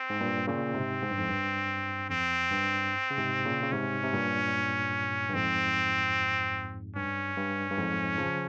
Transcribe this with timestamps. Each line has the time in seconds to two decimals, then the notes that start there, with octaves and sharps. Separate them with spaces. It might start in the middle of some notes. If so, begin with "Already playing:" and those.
Already playing: C4
0.10 G#2
0.20 G2 A#2
0.47 A#2 C#3 C4
0.74 G#2 C3
1.02 G#2
1.11 G2
1.18 F2 G#2
1.28 G2
2.10 F2 C4
2.51 G2
3.11 C#3
3.17 G#2 C3
3.45 A#2 C#3
3.62 C#3
3.72 G#2 C3 C#4
4.03 C3
4.13 G2 A#2
5.29 G2
5.34 F2 G#2 C4
6.96 G2 C#4
7.37 G2
7.70 G2
7.78 F2 G#2
8.18 C#3 F3